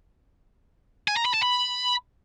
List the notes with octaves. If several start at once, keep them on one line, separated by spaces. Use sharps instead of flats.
G#5
A#5
B5
A5
B5